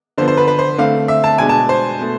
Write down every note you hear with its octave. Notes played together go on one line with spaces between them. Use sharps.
D3 F3 B3 C5
C5
B4
B4
C5
D3 A3 C4 F5
E5
A5
B2 G#3 D4 G#5
A5
C5
B2 A3